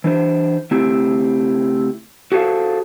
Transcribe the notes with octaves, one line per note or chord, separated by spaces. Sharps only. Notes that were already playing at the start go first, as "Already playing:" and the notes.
E3 D4 C5
C#3 A3 C4 E4 G4
F#4 G#4 A4 C5 F5